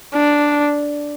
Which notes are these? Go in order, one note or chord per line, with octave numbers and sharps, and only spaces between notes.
D4